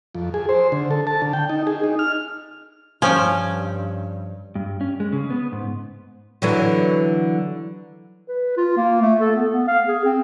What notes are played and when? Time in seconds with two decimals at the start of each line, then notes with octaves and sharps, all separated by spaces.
0.15 F2
0.34 G#4
0.49 C5
0.72 D3
0.91 A4
1.07 A5
1.22 D3
1.33 G5
1.49 D#4
1.67 G#4
1.83 D#4
1.99 F6
3.02 G2 F3 C#4 G5 G#5
4.55 G2
4.81 C#4
5.00 G#3
5.12 C#3
5.30 B3
5.52 G#2
6.42 D3 E3 F#3
8.28 B4
8.57 F4
8.77 A#3
9.02 A3
9.20 A4
9.36 B3
9.52 B3
9.68 F5
9.87 G#4
10.05 C4